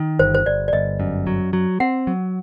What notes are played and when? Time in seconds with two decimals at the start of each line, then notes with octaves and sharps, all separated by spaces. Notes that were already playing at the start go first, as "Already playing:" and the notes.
Already playing: D#3
0.19 G1 C5
0.35 C5
0.46 G1 D5
0.68 D5
0.73 G1 D#5
1.00 F#2
1.27 F#3
1.53 F#3
1.80 C4 F#5
2.07 F#3